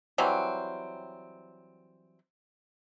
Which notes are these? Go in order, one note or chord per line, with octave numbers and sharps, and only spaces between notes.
E3 F#3 G3 C4